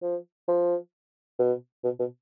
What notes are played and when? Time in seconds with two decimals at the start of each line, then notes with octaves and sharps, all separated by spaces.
0.02 F3
0.48 F3
1.39 B2
1.84 B2
1.99 B2